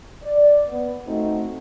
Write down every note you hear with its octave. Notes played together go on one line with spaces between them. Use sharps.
D5
B3
A3 C4 D#4 F#4